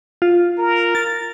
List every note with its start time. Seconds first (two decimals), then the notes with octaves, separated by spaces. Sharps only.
0.22 F4
0.58 A#4
0.95 A6